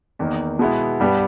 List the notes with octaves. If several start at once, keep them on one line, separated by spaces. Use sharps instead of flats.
E2 D#3 A#3 D#4
B2 G#3 B3 E4
G2 G3 B3 G4